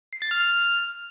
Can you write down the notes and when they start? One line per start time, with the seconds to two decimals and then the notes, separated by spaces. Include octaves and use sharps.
0.13 C7
0.22 A6
0.31 F6